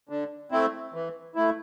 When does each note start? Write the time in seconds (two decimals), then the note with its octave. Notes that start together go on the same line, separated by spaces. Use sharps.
0.09 D3
0.51 A3 C4 E4
0.94 E3
1.35 A3 E4